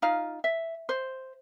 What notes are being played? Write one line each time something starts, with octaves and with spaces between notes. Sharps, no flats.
D#4 F4 F5
E5
C5